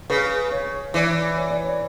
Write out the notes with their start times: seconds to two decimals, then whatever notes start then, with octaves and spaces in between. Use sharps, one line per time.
0.10 C#3 B4
0.52 C#5
0.94 E3 D5
1.36 C#5
1.50 D5
1.64 C#5